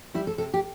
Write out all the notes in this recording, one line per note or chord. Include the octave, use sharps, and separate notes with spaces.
G3 E4
A4
C3 A4
G4